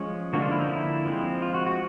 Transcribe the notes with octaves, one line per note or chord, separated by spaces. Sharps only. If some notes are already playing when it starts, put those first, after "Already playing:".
Already playing: F3 G#3 C#4
D3 F3 A#3 D4 F#4
F4
E4
D#4
E4
F3 G#3 C4
F4
F#4
F#4